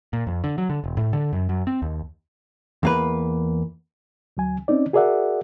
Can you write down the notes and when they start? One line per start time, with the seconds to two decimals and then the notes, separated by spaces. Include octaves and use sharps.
0.13 A#2
0.27 F2
0.44 D3
0.58 F#3
0.69 D3
0.84 E1
0.97 A2
1.13 D3
1.33 F#2
1.49 F#2
1.67 C4
1.82 D#2
2.83 E2 A#3 B4
4.37 D2 F#3 G#5
4.68 C4 C#4 D#4 D5
4.93 F#4 G#4 A#4 D5 E5 F#5